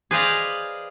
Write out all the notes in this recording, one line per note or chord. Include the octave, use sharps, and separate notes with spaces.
G#4 B4 C5 D5 D#5 F5